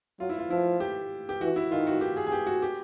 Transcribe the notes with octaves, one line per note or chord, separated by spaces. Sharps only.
F#3 F4
E4
F4
F3 E4
G4
G4
E3 F#4
E4
D#3 F4
F#4
G4
G#4
G#4
G4
F#4
G4